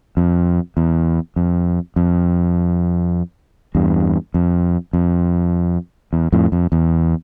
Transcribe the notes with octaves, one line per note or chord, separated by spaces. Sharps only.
F2
E2
F2
F2
E2 G2
F2
F2
E2
F2 A2
F2
E2